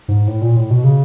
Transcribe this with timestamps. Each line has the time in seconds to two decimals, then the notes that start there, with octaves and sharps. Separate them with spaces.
0.08 G#2
0.28 A2
0.42 A#2
0.56 A2
0.70 B2
0.84 C#3